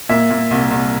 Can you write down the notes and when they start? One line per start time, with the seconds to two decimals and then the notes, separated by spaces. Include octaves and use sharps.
0.09 A#2 E5
0.30 A#2
0.51 C2
0.71 C2